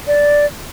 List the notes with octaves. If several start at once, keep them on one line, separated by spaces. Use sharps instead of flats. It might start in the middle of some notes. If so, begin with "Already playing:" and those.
D5